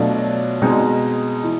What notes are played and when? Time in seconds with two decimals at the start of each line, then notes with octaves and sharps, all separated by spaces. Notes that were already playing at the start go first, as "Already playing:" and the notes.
Already playing: B2 F#3 A3 D4 F4
0.62 B2 G#3 C4 D#4
1.44 E3